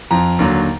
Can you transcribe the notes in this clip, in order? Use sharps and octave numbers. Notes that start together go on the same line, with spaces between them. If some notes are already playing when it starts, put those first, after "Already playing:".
F2 F3 A#5
D#2 D3 F#3